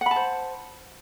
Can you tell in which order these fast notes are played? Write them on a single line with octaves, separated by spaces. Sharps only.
F#5 B5 A5 C5